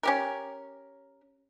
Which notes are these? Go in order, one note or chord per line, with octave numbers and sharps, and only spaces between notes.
C#4 G4 A#4